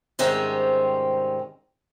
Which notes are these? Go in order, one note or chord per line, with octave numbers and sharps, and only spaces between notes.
G#2 C3 D#3 G3 C4 C#4